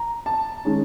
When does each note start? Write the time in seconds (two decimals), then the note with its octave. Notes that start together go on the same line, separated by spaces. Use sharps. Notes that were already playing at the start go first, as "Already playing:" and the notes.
Already playing: A#5
0.26 A5
0.65 D#3 G#3 C#4